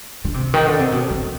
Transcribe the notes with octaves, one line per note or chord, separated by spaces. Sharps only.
D3
C3
D#3
D3
C3
B2
F2